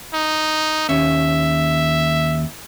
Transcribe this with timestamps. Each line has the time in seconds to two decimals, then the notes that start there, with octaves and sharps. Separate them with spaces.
0.13 D#4
0.89 D#2 C#4 E5